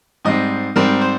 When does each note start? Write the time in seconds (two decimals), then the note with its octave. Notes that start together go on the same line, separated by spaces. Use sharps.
0.25 G#2 G3 C4 D#5
0.76 G#2 G3 C4 A#4
1.01 C5